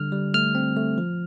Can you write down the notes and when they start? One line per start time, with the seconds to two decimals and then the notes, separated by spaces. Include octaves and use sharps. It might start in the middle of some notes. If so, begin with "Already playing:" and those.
Already playing: D3 G3 F6
0.12 G3
0.34 A3 F6
0.55 C4
0.77 A3
0.98 F3